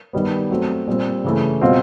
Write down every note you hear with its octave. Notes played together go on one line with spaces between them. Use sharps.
D#3 G3 B3
F#3 A3 C4
A#2 G3 C4
C#3 E3 A3
B2 G3 C4 F4